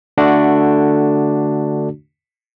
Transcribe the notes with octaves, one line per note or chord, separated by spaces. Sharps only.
D3 A3 D4 F#4